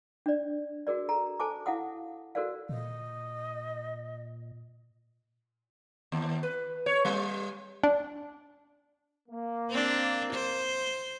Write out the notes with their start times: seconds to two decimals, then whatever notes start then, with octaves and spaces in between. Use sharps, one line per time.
0.26 D4 D5
0.87 F#4 G#4 A#4 D5
1.09 A4 A#5
1.40 A4 C5 G#5 A5 D6
1.66 E4 F5 F#5 D#6
2.35 F#4 A4 A#4 C5 D5 F5
2.69 A#2 D#5
6.12 D#2
6.43 B4
6.86 C#5
7.05 G3
7.83 D4
9.28 A#3
9.71 C4 D4
10.33 C5